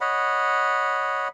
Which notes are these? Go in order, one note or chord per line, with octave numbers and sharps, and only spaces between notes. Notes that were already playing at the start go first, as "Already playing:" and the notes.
C#5 D#5 F#5 B5